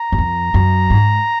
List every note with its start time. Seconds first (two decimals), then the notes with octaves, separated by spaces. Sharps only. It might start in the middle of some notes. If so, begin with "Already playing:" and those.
Already playing: A#5
0.12 F#2
0.18 F2
0.54 F#2
0.90 G#2